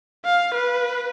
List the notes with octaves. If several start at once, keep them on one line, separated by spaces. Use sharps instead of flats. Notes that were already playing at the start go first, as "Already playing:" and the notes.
F5
B4